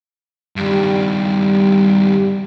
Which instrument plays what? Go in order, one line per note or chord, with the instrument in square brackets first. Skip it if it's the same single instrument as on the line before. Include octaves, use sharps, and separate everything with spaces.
[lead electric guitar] G2 D#3 [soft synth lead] G3